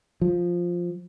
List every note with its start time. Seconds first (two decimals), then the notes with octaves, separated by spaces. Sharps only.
0.21 F3